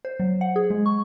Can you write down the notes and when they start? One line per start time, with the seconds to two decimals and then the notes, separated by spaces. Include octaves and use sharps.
0.05 C5
0.20 F#3
0.41 F#5
0.56 G#4
0.70 G#3
0.86 C#6